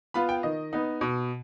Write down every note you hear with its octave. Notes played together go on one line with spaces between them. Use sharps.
B3 F4 B5
G5
D#3 D#5
B3 D#4
B2